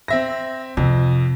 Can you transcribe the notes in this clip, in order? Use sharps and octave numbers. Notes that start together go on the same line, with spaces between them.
C4 E5 A#6
F2 C3